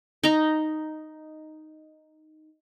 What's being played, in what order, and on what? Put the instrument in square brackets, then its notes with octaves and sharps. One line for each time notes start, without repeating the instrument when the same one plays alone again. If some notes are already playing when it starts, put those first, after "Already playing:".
[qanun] D#4 A#5